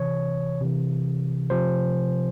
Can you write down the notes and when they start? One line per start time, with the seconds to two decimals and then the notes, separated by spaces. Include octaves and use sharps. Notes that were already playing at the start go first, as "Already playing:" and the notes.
Already playing: C3 E3 C#5
0.61 C3 E3
1.50 C3 F3 C5